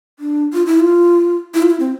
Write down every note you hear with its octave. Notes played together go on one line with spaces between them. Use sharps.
D4
F4
E4
F4
E4
F4
E4
C4